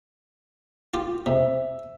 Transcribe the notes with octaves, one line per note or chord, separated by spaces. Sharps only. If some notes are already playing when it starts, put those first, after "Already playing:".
F4 G4
C3 E5